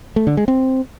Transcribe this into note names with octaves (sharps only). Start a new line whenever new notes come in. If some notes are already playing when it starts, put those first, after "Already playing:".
A3
D3
G#3
C4